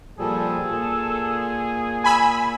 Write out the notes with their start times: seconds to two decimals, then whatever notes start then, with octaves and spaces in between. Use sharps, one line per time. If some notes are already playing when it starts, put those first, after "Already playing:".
0.19 A#2 F3 G3 G#4 A4
0.69 A#2
2.04 G#5 B5 E6